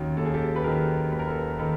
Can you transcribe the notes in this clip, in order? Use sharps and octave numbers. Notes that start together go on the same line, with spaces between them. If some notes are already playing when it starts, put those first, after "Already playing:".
Already playing: D#2 D#3 F#3 C#4 D#4
D#2 A4
G#4
G4 A4
B4
D#3 F#3 G#4 A#4
D#2 B4
A#4
A4 B4
D#3 A4 B4